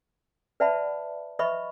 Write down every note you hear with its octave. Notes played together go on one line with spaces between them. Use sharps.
B4 D5 E5 F#5 A5 B5
B4 D#5 E5 B5 C#6